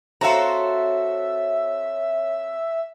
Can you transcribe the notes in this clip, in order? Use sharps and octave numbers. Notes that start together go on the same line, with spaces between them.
C4 F#4 A4 C#5 E5 F5 A#5